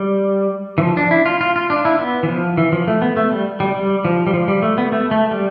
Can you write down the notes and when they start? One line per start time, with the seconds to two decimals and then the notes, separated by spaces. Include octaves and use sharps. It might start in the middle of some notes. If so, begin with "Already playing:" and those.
Already playing: G3
0.78 E3
0.81 F3
0.97 D4
1.11 E4
1.26 F4
1.41 F4
1.56 F4
1.70 D4
1.85 E4
1.99 B3
2.23 E3
2.29 F3
2.57 E3
2.72 F3
2.87 A3
3.02 B3
3.17 A3
3.32 G3
3.60 G3
3.74 G3
4.05 F3
4.27 G3
4.34 F3
4.48 G3
4.62 A3
4.78 B3
4.92 A3
5.11 A3
5.31 G3